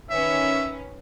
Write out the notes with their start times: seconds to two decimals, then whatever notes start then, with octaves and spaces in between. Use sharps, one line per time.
0.10 D#3 C#4 B4 E5